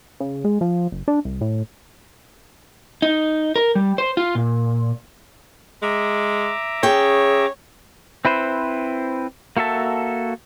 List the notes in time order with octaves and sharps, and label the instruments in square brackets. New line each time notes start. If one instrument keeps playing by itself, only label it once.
[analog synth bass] C#3
G#3
F3
F#1
D4
C2
A2
[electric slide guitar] D#4
A#4
G3
C5
F4
A#2
[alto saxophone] G#3 [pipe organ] E5 A#5 D6
[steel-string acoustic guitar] C#4 G5 [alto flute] G#4 [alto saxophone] C#5
[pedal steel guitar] C4 E4 B4 C5
A#3 F#4 A4 E5 A5